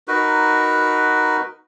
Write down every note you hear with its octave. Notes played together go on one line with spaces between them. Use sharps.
D#4 F#4 A#4 B4